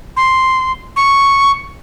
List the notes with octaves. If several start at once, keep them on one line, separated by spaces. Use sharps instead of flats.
C6
C#6